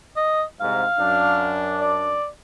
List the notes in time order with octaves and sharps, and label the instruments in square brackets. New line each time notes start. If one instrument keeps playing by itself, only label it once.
[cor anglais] D#5
[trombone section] C2 G#2 [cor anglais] F5
[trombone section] F#2 D4
[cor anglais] D5